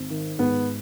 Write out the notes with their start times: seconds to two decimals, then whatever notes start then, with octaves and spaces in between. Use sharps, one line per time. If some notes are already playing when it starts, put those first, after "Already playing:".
Already playing: G#1
0.10 D#3
0.39 G#2 B3